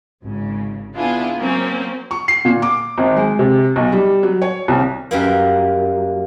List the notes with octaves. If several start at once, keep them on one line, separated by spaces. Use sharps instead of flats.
G#1 C#3
B3 D4 E4 F4 G#4
F#3 A#3 C4 C#4
C#6
C7
A#2
D6
G#1
G#3
C3
B1
G3
F#3
C#5
C2
F#2 G3 A#3